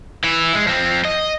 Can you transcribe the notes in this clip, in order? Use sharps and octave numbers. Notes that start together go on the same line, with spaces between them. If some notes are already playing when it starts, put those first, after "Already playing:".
E3 E4
G#3
F3 C4
D#5